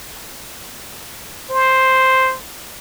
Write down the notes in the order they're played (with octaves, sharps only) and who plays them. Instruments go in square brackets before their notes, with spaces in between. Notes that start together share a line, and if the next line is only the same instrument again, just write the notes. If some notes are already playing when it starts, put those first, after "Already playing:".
[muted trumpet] C5